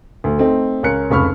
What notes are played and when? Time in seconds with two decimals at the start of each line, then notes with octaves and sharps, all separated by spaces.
0.24 D2
0.38 A3 C4 D#4
0.83 C#2 C#4 A#4 F#6 C#7
1.10 F1 C#2 B5 C#6 F6